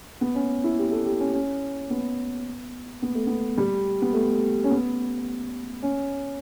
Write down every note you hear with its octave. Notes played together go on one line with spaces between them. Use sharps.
B3
C#4
E4
G4
A4
G4
C#4
C#4
B3
B3
A3
B3
G3
B3
A3
C#4
B3
C#4